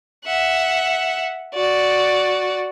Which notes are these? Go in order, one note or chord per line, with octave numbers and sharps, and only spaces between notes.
E5 F#5
F#4 D5